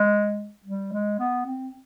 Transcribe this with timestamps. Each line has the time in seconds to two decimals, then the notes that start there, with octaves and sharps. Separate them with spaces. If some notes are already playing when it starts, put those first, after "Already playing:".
Already playing: G#3
0.65 G3
0.92 G#3
1.19 B3
1.46 C4